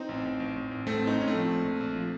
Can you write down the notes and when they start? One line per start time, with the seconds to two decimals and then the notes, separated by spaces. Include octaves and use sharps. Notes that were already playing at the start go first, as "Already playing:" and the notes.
Already playing: C4 D#4
0.09 A1
0.25 A1
0.40 A1
0.56 A1
0.71 A1
0.86 A1 A3 C4
1.02 A2
1.07 C4 D#4
1.18 A2 C#4
1.27 A3 C4
1.34 F3
1.48 A#1
1.64 A#1
1.81 A#1
1.96 F3